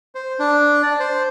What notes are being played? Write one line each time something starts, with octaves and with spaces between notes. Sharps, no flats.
C5
D4
D5
C5